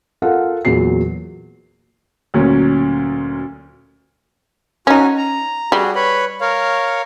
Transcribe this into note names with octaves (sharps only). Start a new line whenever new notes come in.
F4 A4 A#4 F5 F#5
E2 A#2 F#3 C7
D2 A#2 F#3 C#4
C#4 D#4 F#4 G#5
A#5
G3 F#4 G#4
B4 C#5 B5
A#4 C#5 F5